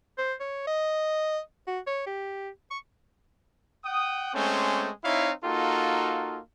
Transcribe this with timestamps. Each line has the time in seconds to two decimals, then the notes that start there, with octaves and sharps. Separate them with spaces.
0.18 C5
0.40 C#5
0.67 D#5
1.67 F#4
1.87 C#5
2.07 G4
2.71 C#6
3.84 F#5 G5 D#6
4.34 G#3 A3 C4 C#4 C5
5.04 C4 D#4 E4 C#5 F5
5.45 A#3 D#4 F4 F#4 A4